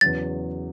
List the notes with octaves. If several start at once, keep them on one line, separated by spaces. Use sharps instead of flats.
E2 C#3 F#3 A6